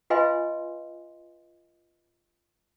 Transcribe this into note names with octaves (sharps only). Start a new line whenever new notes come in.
F4 B4 D#5 F5 G#5 C6